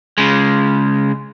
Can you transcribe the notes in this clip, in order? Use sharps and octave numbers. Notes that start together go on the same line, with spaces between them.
C#3 G#3